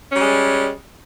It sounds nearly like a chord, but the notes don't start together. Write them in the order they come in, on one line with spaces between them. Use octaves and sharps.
C#4 G3 G#3